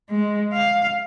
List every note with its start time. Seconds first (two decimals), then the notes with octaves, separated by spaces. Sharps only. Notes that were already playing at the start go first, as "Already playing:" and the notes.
0.10 G#3
0.54 F5